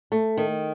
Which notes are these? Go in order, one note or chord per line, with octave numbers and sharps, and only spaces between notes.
A3
D#3